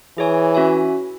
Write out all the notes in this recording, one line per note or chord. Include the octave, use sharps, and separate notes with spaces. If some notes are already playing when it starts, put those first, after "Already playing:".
E3 G#4 C#5 G#5
C#4 F#4 E5 G#5